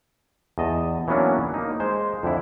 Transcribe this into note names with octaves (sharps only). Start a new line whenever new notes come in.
E2 D#5 A5
E3 F#3 A#3 B3 C#4 D4
A#3 D#4
G#3 C5
F2 D3 E4